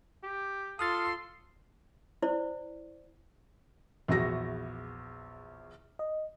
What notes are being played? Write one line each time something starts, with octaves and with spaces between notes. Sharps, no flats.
G4
F4 A4 C6 D#6 F6 A6
E4 C5 D5
A#1 E2 E4 F#4 A#6
D#5